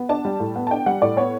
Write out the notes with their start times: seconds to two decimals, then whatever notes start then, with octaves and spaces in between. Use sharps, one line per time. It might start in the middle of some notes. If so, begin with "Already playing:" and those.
Already playing: B3
0.09 D4 A5
0.25 G3
0.40 A2
0.56 B3
0.67 A5
0.71 D4 G5
0.86 G3 F#5
1.02 A2 D5
1.17 B3 C#5